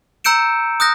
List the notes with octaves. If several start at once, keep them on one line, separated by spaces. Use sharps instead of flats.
A#5 E6 G6 C#7 D7 E7
D#6 F#6 G6 A#6